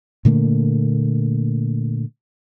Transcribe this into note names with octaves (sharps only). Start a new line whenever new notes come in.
A#2 D3 A3 A#3